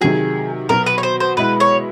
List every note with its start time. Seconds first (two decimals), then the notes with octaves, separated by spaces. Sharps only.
0.01 C3 D#3 F#3 G#4
0.69 B2 F#3 B3 A#4
0.86 B4
0.98 C#5
1.03 C5
1.20 C5
1.37 B2 G#3 B3 E4 B4
1.60 C#5